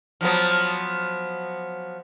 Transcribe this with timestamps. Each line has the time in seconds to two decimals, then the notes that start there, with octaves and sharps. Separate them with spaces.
0.21 F3 F#3 B3